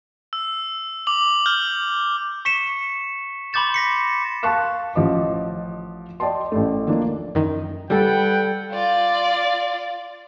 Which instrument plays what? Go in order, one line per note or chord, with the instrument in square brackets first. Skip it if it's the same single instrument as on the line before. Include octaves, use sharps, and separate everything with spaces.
[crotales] E6
D6 F#7
F6 G6
[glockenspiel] C#6 B6 C#7 E7
B5 C6 D6 G6 A6 E7
A#6 B6 C#7
[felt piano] F5 A5 C6 C#6 F#6 E7
A1 F3 D#5 D6
D5 D#5 G5 A5 C6
A1 A3
D#3 F3 A#3 D4
[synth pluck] F#2 D#3
[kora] G3 A4 [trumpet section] B4 F#5 G5
[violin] F4 D5